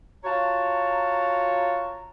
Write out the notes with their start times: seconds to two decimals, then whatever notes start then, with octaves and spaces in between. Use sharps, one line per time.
0.24 F4 F#4 C#5 A5 A#5